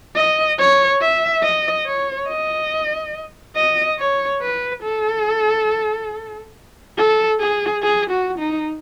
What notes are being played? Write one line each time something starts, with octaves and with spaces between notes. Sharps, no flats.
D#5
C#5
E5
D#5
C#5
D#5
D#5
C#5
B4
A4
A4
G#4
G#4
F#4
D#4